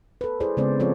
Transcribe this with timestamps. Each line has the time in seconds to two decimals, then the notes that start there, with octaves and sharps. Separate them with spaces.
0.21 A4 B4
0.40 E4 G#4 B4 C5 D5
0.57 C#3 G#3 B3 C4 C5 D5
0.80 F3 C4 F4 A4 C#5 D5